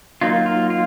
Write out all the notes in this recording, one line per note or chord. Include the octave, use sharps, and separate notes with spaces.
F#3 A#3 D#4 F4
F4
F4